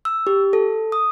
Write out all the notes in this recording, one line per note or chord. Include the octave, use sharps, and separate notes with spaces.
E6
G4
A4
D#6